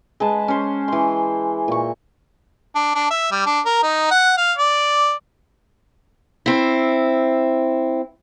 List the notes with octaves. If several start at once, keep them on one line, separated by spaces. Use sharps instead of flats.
G#3 B4 A5
C#4 C5
E3 C6
A#2 C#6
D4
D4
E5
G3
D4
A#4
D#4
F#5
F5
D5
C4 E4